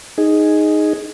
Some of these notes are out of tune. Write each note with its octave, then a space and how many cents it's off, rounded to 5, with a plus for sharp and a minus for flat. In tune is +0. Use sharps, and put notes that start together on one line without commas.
D#4 +0 G#4 +0